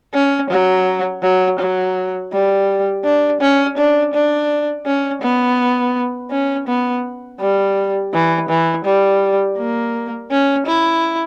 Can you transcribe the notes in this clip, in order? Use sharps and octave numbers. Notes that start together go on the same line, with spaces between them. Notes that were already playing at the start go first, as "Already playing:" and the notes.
C#4
F#3
F#3
F#3
G3
D4
C#4
D4
D4
C#4
B3
C#4
B3
G3
E3
E3
G3
A#3
C#4
E4